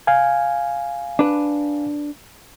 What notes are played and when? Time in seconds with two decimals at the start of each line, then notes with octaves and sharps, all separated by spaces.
0.07 F5 G#5
1.19 D4 B4